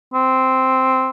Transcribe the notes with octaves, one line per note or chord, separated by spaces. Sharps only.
C4